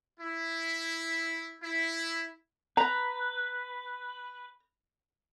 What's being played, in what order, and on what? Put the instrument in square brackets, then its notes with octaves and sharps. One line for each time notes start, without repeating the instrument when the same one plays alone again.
[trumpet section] E4
E4
[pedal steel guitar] B4 [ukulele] A#5